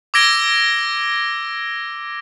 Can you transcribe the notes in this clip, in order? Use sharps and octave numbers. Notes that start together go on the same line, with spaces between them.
D6 E6 G#6 A#6 D7 G7